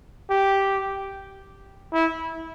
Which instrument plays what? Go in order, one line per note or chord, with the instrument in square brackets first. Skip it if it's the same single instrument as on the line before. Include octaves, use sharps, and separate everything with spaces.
[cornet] G4
E4